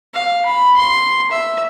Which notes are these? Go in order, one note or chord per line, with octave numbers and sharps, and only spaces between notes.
F5
B5
C6
E5